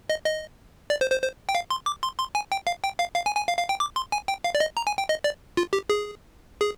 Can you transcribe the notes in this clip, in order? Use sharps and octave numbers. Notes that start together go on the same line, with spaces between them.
D#5
D#5
D5
C5
C5
C5
G5
F5
C6
D6
C6
C6
G#5
G5
F5
G5
F5
F5
G#5
G#5
F5
F5
G5
D6
C6
G#5
G5
F5
D5
D#5
A#5
G#5
G5
D#5
D5
F4
G4
G#4
G#4